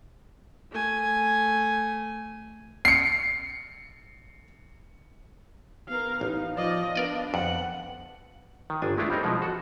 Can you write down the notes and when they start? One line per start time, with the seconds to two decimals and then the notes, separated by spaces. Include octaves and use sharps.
0.72 A3 G#5
2.85 C7 C#7
5.89 B3 A#4 F5
6.21 A1 D#4 F5
6.57 F3 D5 D#5
6.96 B3 D4 A#4 D5 D#5
7.34 F2 F#5
8.70 D#3
8.82 G1 D4 G#5
8.97 G#3 A3 D4 E4 F4
9.10 G3 C4 D#4 A#4
9.23 B2 F3 G#3
9.42 F#4 A4